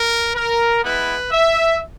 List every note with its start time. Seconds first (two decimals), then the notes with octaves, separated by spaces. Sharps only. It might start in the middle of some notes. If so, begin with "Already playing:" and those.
Already playing: A#4
0.35 A#4
0.83 G#3 B3 E4 B4
1.31 E5